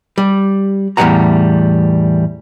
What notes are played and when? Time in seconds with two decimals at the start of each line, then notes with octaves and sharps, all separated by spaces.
0.18 G3
0.97 E2 A2 F#3 G3 F#5 A#5